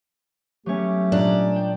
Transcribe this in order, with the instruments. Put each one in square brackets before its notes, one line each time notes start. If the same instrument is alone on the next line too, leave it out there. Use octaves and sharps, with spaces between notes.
[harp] F#3 B3 C#5 [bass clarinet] A3 [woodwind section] C#4 G4
[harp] A#2 G#3 A#5 [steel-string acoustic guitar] D4
[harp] G5